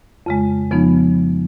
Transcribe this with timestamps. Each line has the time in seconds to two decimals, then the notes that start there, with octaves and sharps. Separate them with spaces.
0.26 F2 C#3 G#3
0.70 F2 C#3 F3 B3 D#4